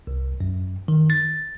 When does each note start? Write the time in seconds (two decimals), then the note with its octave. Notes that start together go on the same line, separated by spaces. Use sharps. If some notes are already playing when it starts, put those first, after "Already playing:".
0.07 C2
0.41 F#2
0.88 D#3
1.10 A6